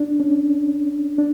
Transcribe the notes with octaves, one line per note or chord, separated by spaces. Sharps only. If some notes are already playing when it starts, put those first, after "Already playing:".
Already playing: D4
C#4
D4